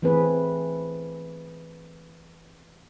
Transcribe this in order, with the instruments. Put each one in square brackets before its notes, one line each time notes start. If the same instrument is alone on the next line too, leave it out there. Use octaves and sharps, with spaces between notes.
[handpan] E3 A3 C4 G#4 B4